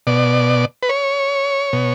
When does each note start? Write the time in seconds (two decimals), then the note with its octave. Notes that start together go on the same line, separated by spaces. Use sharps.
0.07 B2 D5
0.83 B4
0.89 C#5
1.73 B2